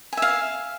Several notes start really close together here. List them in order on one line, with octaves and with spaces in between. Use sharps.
G#5 E5 F5